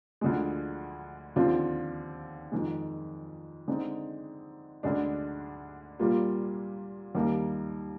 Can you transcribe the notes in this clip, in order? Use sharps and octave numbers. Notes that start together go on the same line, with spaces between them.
D2 D3 F3 G#3
D#2 D3 F3 C4 F4
F2 D#3 G#3
D3 G#3 C4 D#4
D2 D3 G#3 D4
A#2 G3 A#3 F4
D#2 D#3 G3 A#3